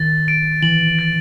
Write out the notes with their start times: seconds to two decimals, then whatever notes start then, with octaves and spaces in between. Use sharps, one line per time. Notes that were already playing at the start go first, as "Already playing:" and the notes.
Already playing: D#3 A6
0.28 D7
0.62 E3 F#7
0.99 A6